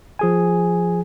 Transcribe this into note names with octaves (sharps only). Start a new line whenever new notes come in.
F3 G#4 G#5